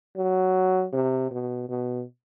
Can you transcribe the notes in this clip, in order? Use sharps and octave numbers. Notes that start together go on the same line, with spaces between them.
F#3
C3
B2
B2